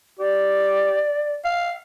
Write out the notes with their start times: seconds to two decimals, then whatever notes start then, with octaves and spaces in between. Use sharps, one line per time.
0.20 G4 D5
1.45 F5